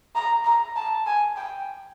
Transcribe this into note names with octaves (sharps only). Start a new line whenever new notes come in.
A#5
A#5
A5
G#5
G5